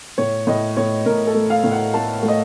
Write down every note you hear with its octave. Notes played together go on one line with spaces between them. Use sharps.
A2 C#5
A2 D#5
A2 C#5
A2 A#4
A4
A3
F5
A2
F#5
A3 A5
A3
D#5